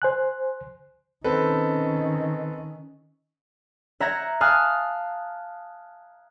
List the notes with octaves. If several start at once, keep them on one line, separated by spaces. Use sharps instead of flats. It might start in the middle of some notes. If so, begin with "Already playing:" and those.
C5 G#5 F#6
D#3 C4 C#4 A4 B4
E5 F#5 A#5 G6 G#6 A#6
F5 G#5 A5 D#6 F6 F#6